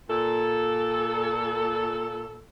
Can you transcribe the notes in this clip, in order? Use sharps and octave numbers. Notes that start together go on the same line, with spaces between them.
A#2 A4